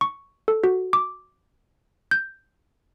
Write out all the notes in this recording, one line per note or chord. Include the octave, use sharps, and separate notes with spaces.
C#6
A4
F#4
D6
G6